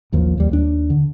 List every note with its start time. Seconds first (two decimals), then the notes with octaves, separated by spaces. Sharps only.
0.12 A1 D#2 D#3 F3
0.38 D#2 G3
0.51 D#2 D4
0.90 D3